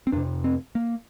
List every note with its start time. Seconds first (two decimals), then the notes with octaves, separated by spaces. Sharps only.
0.07 C4
0.12 F2 C3 D4
0.44 C4
0.75 A#3